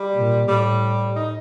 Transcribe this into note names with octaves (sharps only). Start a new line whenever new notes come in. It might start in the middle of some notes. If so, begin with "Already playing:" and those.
Already playing: G3
A#2
A2 G3
D#4